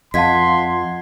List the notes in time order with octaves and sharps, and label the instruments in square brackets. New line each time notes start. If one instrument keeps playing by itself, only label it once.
[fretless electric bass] F2 [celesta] D#5 F5 A5 [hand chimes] F#5 G#6 B6 [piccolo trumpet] C6